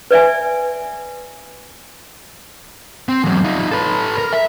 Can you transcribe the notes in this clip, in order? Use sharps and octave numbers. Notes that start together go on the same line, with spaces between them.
B4 D5 E5 G#5
C4
E2 F#3
D#4 F4
A4 B4
A#4
E5